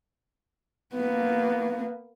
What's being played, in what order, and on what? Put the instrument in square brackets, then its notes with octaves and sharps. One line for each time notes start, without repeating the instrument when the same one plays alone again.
[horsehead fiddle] A#3 B3